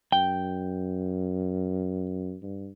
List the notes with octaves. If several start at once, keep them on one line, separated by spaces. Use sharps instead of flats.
F#2 G5
G2